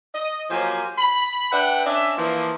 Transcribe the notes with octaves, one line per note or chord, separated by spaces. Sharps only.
D#5
F3 F#3 A#3 G4 C5 G#5
B5
D4 B4 E5 F#5 G5
C#4 D4 D#5 E5
E3 F3 A#3